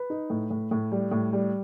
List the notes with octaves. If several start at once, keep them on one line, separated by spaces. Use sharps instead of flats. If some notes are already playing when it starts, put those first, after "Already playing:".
Already playing: B4
D#4
A2
A2
A2
G3
A2
G3